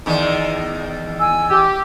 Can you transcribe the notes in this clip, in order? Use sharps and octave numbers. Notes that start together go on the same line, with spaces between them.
E2 D#3
G#5 E6
G4